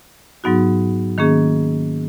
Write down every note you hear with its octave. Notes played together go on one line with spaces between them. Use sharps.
G#2 F#3 B3 D#4 F#4
D#3 A#3 C#4 G#4